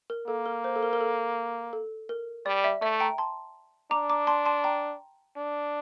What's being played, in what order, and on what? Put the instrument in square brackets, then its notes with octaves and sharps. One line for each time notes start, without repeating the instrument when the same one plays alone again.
[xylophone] A#4
[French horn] A#3 [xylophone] A4
[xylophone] A#4
C5
A4
A#4
A#4
A4
A4
A#4
[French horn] G3 [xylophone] D5
[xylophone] E5
[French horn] A3 [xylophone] E5
[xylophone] G5 A#5
A5 C6
[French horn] D4 [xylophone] A#5 D6
[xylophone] A#5 D6
A5 C6
A5 C6
G5 A#5
[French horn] D4